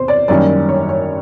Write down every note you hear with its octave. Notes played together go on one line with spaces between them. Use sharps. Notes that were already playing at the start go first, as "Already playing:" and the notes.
Already playing: E2 C3 C5
D5
F#2 D#3 G3 A#3 C#4 D5
C#5
C#5